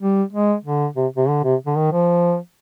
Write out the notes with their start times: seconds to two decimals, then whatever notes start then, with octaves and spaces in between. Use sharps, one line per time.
0.01 G3
0.33 G#3
0.64 D3
0.96 C3
1.17 C3
1.28 D3
1.44 C3
1.66 D3
1.76 D#3
1.92 F3